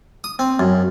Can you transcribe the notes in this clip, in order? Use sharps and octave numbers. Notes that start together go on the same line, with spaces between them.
D#6
C4
F#2